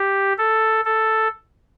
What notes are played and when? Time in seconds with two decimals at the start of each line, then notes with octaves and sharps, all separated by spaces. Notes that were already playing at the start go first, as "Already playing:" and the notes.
Already playing: G4
0.38 A4
0.85 A4